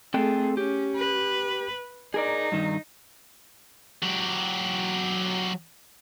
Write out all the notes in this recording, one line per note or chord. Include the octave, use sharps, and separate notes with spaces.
A3 C4 G#4 A4 G5
C#4 G4
B4
D#4 G#4 A#4 D5
G2 D#3
F#3 G4